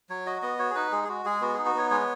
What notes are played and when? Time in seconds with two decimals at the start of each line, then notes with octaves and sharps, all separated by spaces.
0.10 F#3 C#5
0.26 F#4 D#5
0.42 B3 D#5
0.59 F#4 C#5
0.71 G#4
0.75 D#4 B4
0.92 G#3 G#4
1.04 G#4
1.08 G#3 F#4
1.25 G#3 G#4
1.41 B3 F#4
1.54 D#4 G#4
1.66 F#4
1.75 B3 C#5
1.91 G#3 C#5